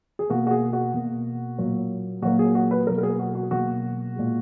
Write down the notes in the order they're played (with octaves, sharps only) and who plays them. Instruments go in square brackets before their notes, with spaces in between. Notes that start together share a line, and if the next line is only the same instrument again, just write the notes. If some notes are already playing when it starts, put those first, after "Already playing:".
[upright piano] G#4
B2 A#3 F#4
F#4
G#4
F#4
B2 A#3
A#2 F#3 A#3
A#2 F#3 A#3 F#4
G#4
F#4
B4
B2 F#3 A#3 A#4
A#4
G#4
F#4
F#4
B2 F#3 A#3 F#4
A#2 G#3